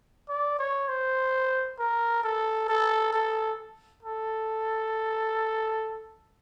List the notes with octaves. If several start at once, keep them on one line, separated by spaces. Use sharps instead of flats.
D5
C#5
C5
A#4
A4
A4
A4
A4